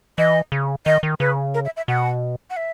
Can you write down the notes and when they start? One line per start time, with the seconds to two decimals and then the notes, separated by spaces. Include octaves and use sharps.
0.18 E3 D#5
0.52 C#3
0.86 D#3 D#5
1.03 D#3
1.20 C#3 B4
1.54 A#4
1.65 E5
1.77 E5
1.88 B2 F#5
2.50 F#5
2.57 E5